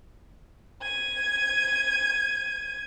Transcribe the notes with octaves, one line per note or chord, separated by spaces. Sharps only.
G#6 D#7